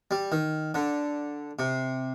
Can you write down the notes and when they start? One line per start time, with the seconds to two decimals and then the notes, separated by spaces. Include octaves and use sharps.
0.11 G3
0.32 D#3
0.74 D3
1.59 C3